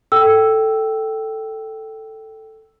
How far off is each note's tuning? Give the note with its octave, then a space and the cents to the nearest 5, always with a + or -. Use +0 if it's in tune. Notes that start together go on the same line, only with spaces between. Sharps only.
A4 +0 G5 -10 E6 +0